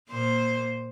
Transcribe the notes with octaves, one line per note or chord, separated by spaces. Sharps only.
A#2 A#3 C5